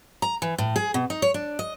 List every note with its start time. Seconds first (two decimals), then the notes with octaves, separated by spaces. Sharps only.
0.22 A#5
0.42 E3
0.58 A2
0.76 G#4
0.94 B2
1.10 D#4
1.22 C#5
1.34 D4
1.59 D#5